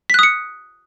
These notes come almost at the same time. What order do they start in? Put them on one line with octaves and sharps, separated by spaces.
B6 F#6 D#6 C#7